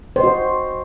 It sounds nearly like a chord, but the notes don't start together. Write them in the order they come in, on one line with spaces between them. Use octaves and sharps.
C5 D#5 F#4